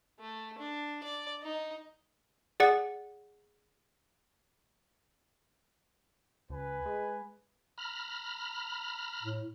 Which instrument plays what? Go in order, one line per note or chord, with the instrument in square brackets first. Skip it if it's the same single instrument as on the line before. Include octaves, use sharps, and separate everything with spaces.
[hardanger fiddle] A3
D4
D5
D#4
[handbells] G#4 D5 F#5
[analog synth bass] C#2 [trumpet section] B4 G#5
[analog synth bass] G#3
[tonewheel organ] A#5 B5 F6
[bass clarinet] A2